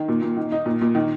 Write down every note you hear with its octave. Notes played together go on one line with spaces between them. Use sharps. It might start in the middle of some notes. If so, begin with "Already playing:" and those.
Already playing: D#3
A#2
A#2
D#3
D#4
A#2
A#2
D#3